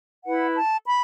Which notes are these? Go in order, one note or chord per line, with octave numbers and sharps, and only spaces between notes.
E4 B4 F#5
A5
B5